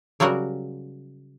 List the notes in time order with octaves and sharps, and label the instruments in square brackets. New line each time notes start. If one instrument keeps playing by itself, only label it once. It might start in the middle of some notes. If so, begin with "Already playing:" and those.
[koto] C#3 F#3 G3 F#4 A#4